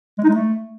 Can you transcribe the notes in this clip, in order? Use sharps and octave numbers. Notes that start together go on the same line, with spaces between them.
G#3
D#4
G#3
A3